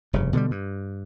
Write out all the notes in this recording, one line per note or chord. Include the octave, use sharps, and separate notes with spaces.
F1 G2 C#3
B2 D3 F#3 G3
G2